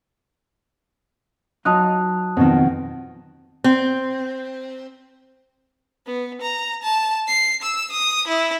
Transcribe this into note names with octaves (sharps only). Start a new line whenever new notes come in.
F#3 D#4 F4 A5 D#6 F#6
F2 B2 D#3
C4
B3
A#5
A5
C7
E6
D#6
E4